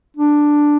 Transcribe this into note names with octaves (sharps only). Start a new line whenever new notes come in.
D4